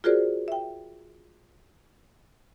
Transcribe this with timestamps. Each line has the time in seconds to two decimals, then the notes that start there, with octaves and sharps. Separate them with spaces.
0.04 F4 F#4 G#4 A#4 C5 D5
0.48 E5 G5